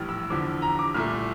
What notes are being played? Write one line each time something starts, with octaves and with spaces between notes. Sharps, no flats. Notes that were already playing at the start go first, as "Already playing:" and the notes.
Already playing: A#1 A2 E3 G3 F6
E6
E2 D3 F3 D6
A#5
D6
C2 A#2 A3 F6